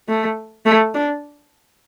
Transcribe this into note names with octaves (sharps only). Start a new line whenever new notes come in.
A3
A3
D4